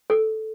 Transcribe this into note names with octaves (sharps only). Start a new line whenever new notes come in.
A4